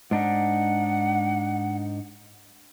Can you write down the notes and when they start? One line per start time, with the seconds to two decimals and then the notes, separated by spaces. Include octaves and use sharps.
0.11 G#2 D4 D#4 F#5